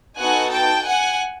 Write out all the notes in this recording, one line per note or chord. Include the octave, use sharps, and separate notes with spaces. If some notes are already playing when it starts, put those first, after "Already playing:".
B3 D#4 F#4 A4 F#5 G#5
G5 A5
F#5 G#5